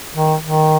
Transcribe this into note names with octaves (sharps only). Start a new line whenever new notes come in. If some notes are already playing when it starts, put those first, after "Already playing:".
D#3
D#3